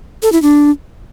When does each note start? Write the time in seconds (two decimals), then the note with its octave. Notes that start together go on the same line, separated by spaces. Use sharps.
0.23 A4
0.32 E4
0.42 D4